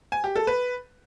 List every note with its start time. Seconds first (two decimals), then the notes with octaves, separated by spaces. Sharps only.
0.12 G#5
0.24 G4
0.36 A4
0.47 B4